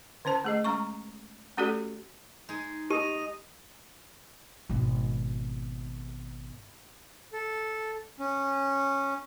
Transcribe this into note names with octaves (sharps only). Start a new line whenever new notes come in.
D3 C#4 C5 A5
A3 G#4 D#5
G#3 C#4 A#5 C#6
A3 C#4 F#4 G4 A4 D5
G#3 D#4 G#4
G4 D#5 D#6 D#7
G#1 B2
A4
C#4